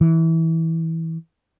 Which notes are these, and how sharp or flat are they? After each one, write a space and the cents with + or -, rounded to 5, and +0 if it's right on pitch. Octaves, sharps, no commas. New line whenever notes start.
E3 -15